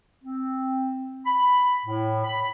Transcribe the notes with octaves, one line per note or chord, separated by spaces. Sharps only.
C4
B5
A2
B5